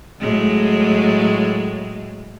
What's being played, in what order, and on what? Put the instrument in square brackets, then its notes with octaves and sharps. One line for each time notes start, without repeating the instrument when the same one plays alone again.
[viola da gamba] A2 F#3 G#3